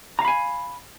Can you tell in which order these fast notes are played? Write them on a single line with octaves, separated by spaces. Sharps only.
A#5 F5 B5 G#5